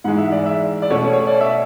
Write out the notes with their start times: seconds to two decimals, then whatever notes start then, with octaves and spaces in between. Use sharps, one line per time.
0.04 G#2 E3 G#3 F#5
0.18 E5
0.32 D5
0.46 E5
0.82 D5
0.90 B2 A3 C#4 C#5
1.13 C#5
1.27 D5
1.41 E5